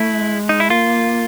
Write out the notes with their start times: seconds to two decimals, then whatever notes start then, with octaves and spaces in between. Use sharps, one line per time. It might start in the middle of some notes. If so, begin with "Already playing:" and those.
Already playing: A3 E4
0.21 G#3
0.49 D#4
0.60 E4
0.70 A#3 F4